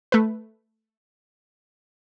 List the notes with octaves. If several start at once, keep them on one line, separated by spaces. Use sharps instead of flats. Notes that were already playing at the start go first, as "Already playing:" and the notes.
A3 B4